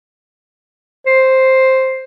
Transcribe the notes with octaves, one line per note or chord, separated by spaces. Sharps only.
C5